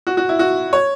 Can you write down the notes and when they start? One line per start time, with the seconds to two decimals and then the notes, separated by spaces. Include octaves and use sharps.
0.07 F#4
0.17 F#4
0.29 E4
0.39 F#4
0.73 C#5